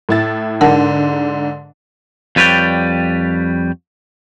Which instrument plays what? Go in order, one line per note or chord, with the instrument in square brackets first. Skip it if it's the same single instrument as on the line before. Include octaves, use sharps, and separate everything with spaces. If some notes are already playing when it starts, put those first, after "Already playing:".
[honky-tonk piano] A2 E4 A6
[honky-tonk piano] G#2 D3 [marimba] A#4 F#5 A5
[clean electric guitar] F2 G3 B4 C#5 D5 G5